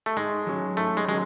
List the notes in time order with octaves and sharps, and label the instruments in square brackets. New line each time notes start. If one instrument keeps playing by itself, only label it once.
[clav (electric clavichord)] A3
[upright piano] G#2 [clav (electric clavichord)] G#3
[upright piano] F#3 C#4
[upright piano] G#2 [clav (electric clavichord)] A3
[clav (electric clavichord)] G#3
[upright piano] F#3 C#4 [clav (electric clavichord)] G#3